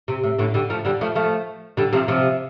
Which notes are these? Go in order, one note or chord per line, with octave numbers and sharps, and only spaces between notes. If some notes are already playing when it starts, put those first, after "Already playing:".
C3
A2
A2 D3
D3 G3
F3 A3
D3 G3
F3 A3
F3 A3
D3 G3
C3 F3
C3 F3